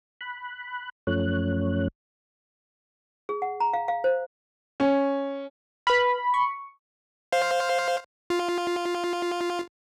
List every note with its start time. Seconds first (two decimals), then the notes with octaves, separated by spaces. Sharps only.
0.21 B5 F#6
1.07 F#2 F3 A3 C#4 C#5 F#6
3.29 G#4
3.42 F#5
3.60 A#5
3.73 F5
3.88 F5
4.04 C5
4.80 C#4
5.87 B4 B5 F6
6.34 C#6
7.32 C5 F5
8.30 F4